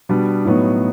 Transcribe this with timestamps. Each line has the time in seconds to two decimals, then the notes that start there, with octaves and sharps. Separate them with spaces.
0.09 B2 G3 B3 D4
0.45 A2 F#3 B3 D#4